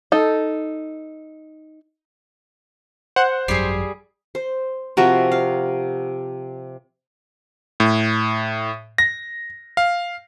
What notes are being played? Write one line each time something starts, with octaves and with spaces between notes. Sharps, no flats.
D#4 A4
C5 F#5
G#1 F#2 F#3 G3 G#4 C7
C5
C3 F3 F#4 A#4 E5
F5
A2
A#6
F5